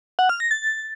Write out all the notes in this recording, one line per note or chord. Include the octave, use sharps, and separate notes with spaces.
F#5
F6
A#6
A6